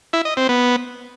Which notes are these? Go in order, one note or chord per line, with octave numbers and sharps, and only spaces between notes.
E4
D#5
C4
B3